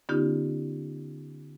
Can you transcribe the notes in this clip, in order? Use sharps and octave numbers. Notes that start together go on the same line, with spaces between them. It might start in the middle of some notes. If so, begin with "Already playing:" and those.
D3 B3 C#4 D#4 F4 G4